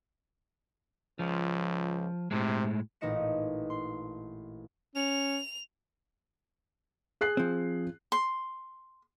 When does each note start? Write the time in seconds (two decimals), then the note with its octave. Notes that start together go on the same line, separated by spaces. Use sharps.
1.19 C#2 F3
2.31 A2 C3 G#3
3.01 A1 A#2 D#4 D#5 C#7 E7
3.70 C6
4.96 C#4 F7
7.21 G#4 F#6 C7
7.37 F3 C4
8.12 C6